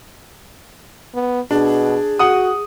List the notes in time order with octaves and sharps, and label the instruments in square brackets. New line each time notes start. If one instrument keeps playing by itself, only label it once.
[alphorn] B3
[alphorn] B2 [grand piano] D4 [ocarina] G#4
[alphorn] F#4 [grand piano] F#5 D#6